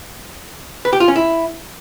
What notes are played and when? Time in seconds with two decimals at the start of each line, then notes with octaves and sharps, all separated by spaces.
0.85 B4
0.93 G4
1.00 F4
1.08 C#4
1.16 E4